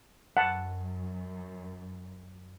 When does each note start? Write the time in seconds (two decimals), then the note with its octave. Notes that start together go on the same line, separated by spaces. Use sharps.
0.37 F#2 F#5 A5